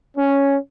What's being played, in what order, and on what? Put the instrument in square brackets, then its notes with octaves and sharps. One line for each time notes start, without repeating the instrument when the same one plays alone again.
[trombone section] C#4